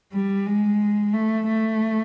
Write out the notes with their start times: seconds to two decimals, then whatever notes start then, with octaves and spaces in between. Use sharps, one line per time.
0.13 G3
0.47 G#3
1.13 A3
1.48 A3